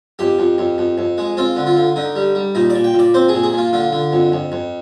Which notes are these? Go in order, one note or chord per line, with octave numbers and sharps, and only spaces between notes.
F2 G4
F2
F2
F2
F2
G#3
C4 F4
D3
F4
D3
D3 D#4
G3
G3
A#2 D#4
D5
A#2
G5
A#2
D5
C4 C5
A#2 G#4
G#4
A#2 F4
D3 F4
D3
F2
F2
F2